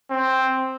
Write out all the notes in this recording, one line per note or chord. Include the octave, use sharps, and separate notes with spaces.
C4